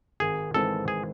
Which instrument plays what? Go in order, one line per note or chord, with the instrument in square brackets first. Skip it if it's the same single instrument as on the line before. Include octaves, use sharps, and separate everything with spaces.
[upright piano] G#1 [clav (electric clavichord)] G#4
[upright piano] G#2 E3 G#3 C4 [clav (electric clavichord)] A4
[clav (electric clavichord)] G#4